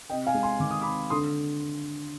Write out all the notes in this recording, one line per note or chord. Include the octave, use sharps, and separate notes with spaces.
C3 D#5 G5
F5 G#5
G#3
G#5 C6
D#3 D6
D#6
C3 B5 D6
D3 C6 D#6